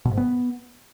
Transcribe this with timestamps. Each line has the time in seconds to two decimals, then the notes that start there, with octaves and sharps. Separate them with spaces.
0.05 B2
0.11 G#2
0.17 B3